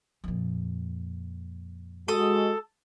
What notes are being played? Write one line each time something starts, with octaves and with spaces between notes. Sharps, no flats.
F2 A#2
G#3 F#4 A4 D#6